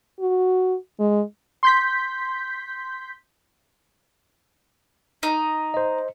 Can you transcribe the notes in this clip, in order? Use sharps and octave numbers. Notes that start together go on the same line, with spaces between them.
F#4
G#3
C6 G6 B6
D#4
C5 D#5